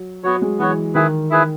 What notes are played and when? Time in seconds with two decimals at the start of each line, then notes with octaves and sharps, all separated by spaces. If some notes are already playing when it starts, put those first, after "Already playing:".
Already playing: F#3
0.23 F#3 B3 F#4 C#5
0.42 G#3
0.59 E3 B3 F#4 C#5
0.95 D#3 E4 G#4 B4
1.30 E4 G#4 B4